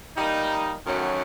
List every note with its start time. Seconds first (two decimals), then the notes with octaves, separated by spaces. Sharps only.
0.17 G3 A#3 D#4
0.86 F#2 D#3 F#3 A3 C#4